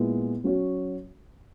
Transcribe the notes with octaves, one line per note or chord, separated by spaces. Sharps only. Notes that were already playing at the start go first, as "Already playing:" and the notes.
Already playing: A#2 G#3 B3 E4
F#3 C#4 F#4 C#5